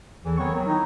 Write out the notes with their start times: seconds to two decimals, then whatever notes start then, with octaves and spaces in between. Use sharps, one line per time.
0.25 E2 E3 A4
0.38 D#3 F#3 B3 C4 C#5 C#6
0.53 D#3 F#3
0.67 D#4 E4